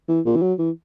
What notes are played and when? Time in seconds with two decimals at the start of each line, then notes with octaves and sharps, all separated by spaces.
0.09 E3
0.25 A#2
0.36 E3
0.42 F#3
0.59 E3